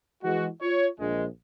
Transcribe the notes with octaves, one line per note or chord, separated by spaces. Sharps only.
E3 G#3 F#4
F4 C#5
A#1 G#3